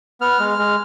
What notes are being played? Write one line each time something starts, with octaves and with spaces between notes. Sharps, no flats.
B3 F6
G#3
F6
G#3